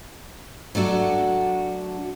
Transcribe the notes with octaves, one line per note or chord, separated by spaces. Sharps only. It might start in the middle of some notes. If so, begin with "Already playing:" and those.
F#3 A3 D4 F#4